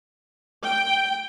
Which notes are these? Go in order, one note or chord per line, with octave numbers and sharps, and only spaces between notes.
G5